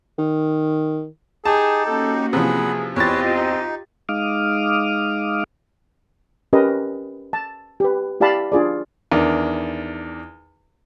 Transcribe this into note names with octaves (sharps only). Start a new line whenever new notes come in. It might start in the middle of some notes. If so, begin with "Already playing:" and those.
D#3
D#4 G4 G#4 A5
A#3 C#4 F#4 A4
C3 E3 F3 G#4 F#5 B5
E2 C4 F4 G4 B4 C#5 D#5 A6
D#4
G#3 D#4 F5 D6 D#6 F6
C#4 G4 A#4 B4 D#5
A5
G4 B4
E4 G4 D5 F5 A5 B5
D4 F4 G#4 D5
E2 D#3 D4